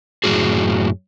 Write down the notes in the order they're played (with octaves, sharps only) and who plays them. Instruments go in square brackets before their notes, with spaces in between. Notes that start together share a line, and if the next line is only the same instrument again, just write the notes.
[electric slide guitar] F#2 A2 F#4 G#4